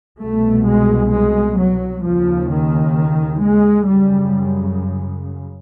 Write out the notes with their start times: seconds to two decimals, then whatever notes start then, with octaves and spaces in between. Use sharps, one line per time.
0.21 C2 B2 A3
0.67 G#3
1.13 G#3
1.58 F#3
2.04 D#2 C#3 F3
2.50 D#3
3.41 G#3
3.87 F#2 C#3 G3